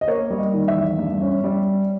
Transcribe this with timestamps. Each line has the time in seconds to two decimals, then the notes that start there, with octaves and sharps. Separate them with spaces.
0.01 D#5
0.07 A#3 C#5
0.30 G3
0.38 D#5
0.53 D#3
0.68 E5
0.76 E2
0.98 G2
1.21 C#4
1.44 G3